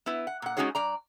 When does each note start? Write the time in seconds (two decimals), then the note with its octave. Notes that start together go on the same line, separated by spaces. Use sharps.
0.06 B3 E4 B4
0.27 F#5
0.42 A#2 F#5
0.57 G#3 C#4 D#4 F#4 G#4 C#5
0.75 G2 D5 A#5